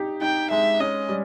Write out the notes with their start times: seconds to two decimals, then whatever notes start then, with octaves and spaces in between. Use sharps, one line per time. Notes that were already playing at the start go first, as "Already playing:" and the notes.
Already playing: D#4 G4
0.21 D#4 G5
0.51 G#3 E5
0.80 C#4 D#5
1.09 G3